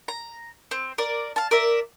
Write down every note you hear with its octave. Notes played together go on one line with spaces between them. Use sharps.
A#5
C4
A#4 D5
F5 A5
A#4 D5 E5